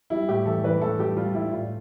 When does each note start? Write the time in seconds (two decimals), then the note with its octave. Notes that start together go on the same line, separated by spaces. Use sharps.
0.10 G3 E4
0.28 A2 G4
0.46 E3 A4
0.64 E3 B4
0.82 A2 A4
0.99 G3 G4
1.17 G3 F4
1.34 G3 E4
1.52 A2 F4